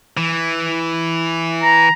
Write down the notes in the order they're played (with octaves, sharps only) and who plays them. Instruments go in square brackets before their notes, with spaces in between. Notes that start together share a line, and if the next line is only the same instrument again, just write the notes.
[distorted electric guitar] E3
[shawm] A#5